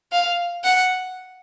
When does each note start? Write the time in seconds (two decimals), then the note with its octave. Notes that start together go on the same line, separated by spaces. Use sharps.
0.12 F5
0.64 F#5